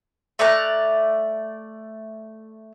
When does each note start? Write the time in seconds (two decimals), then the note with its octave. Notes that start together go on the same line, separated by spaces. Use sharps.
0.39 A3 D5 A#5 F#6